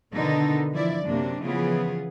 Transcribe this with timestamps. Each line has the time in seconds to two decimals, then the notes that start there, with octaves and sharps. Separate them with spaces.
0.14 B2 D3 D#3 B3 D#4 A4
0.71 E3 F3 E4 D5
1.06 F#2 C3 F#3 A#3 D4
1.42 C#3 E3 F3 B3 F4 G#4